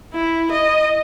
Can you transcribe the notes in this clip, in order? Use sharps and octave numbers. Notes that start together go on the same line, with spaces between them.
E4
D#5